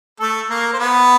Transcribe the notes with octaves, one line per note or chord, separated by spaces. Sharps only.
A3 A4
A#3 A#4
C5
B3 B4